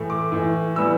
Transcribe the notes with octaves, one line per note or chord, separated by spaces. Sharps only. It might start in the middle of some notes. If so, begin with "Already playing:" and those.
Already playing: A2 E3 A3
D6
A2 E3 A3
E3 G3 B3 E6